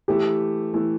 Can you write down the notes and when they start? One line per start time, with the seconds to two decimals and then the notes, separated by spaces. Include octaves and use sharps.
0.08 E3 A3 E4 G4
0.74 E3 A3 E4